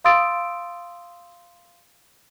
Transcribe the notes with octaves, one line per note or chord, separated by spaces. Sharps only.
F5 C6 D#6 E6 A6 D7